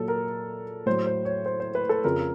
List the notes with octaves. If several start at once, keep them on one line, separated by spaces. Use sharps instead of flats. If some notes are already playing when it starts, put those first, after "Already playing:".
Already playing: A#2 F#3 A4
A#4
A2 F#3 C5
C5
C#5
C5
C5
B4
A4
F2 C#3 F3 A#4